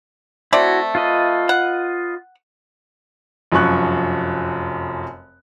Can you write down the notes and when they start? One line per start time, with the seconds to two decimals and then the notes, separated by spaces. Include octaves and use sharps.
0.53 A3 C4 E4 F#4 D5
0.95 F4 B4 D#5
1.49 F#5
3.52 F1 F#2 F3 G#5 C#6 F#6